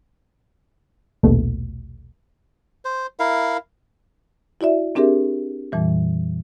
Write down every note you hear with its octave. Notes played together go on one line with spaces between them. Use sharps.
A#1 D#2 B2 A3
C5
E4 A#4 F5
E4 F#4 D5 E5
C4 D4 G4 G#4 A#4 E5
F2 A#2 E3 G3